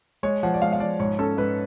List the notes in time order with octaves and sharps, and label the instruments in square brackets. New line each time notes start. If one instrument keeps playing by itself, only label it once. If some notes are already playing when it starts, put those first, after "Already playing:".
[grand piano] G#3 C#5
F3 F#5
D5
G#3 F5
F5
F3 D5
G#2 C#5
C#4 A4
G#2 B4